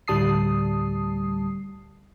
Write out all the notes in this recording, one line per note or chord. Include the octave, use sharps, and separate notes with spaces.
D2 A2 G3 A5 D#6 C7